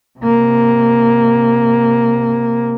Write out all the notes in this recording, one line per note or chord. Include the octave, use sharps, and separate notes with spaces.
C3 A#3